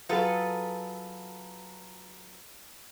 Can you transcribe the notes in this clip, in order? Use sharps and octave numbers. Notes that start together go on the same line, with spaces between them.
F#3 F4 G#4 A4 B4